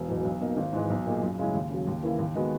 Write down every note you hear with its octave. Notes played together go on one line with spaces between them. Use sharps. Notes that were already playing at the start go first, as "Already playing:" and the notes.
Already playing: E1
E2 B2 F#3
B1
B2 A#3 D#4
G#1
G#2 E3 G#3
B1
A#2 A#3 D#4 G#4
F#2
C#3 G#3 C#4 E4
D#2
C#3 F#3
D#2
C#3 E3 A#3 E4
D#2
D#3 G#3 B3 F#4